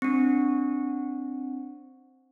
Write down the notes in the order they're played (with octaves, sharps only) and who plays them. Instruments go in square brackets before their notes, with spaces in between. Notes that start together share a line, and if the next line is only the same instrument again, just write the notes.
[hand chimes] C4 D4